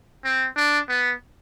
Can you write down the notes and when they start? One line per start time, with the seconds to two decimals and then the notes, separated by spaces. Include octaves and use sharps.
0.24 C4
0.56 D4
0.89 B3